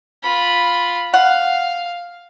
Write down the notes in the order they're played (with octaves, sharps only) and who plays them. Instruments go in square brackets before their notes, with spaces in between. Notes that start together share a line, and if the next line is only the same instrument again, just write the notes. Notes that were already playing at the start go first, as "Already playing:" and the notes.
[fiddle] F4 B5
[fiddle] F5 [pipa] F#5